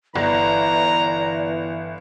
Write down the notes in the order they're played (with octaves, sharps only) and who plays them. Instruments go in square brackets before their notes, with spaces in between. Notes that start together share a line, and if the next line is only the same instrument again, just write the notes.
[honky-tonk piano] G1 [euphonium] E3 [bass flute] D5 [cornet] A#5